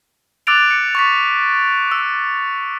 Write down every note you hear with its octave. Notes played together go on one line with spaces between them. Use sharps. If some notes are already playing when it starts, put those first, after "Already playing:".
D6 E6 F#6 A6 D7 F7
C#7
C#6 A6 B6
E6